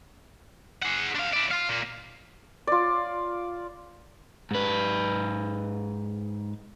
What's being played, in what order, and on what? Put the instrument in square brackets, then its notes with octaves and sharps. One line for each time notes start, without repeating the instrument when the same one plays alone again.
[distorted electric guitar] G#4 F#5
D4 F5
E4 D5
F4 F5
A#2 A#3
[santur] F4 D5
[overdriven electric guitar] G#2 B4